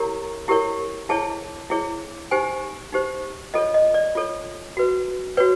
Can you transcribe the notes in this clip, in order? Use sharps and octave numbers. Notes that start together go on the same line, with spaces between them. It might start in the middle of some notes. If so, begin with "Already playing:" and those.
Already playing: E4 G4 A#4 C#5 A#5
E4 G4 A#4 C#5
E4 G#4 C#5 A5
E4 G#4 C#5
D#4 G4 C5 G#5
D#4 G4 C5
F4 A4 C#5 D#5
D#5
D5
F4 A4 C#5
F#4 B4
F#4 B4 C#5